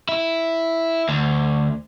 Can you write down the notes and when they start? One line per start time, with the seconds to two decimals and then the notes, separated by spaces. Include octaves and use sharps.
0.09 E4
1.09 D2